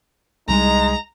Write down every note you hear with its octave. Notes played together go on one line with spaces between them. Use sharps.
C2 G3 G#3 D#4 A#5